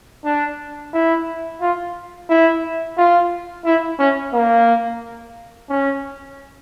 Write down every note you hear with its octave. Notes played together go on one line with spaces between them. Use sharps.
D4
E4
F4
E4
F4
E4
C#4
A#3
C#4